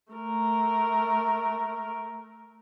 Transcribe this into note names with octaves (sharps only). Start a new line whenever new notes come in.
A3 A#4